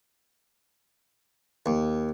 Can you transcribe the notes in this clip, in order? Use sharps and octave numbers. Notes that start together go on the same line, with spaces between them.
D#2